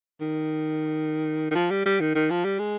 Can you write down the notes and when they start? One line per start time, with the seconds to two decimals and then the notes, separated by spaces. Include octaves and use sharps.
0.21 D#3
1.51 D#3
1.55 F3
1.71 G3
1.86 G3
2.00 D#3
2.15 D#3
2.31 F3
2.45 G3
2.59 G#3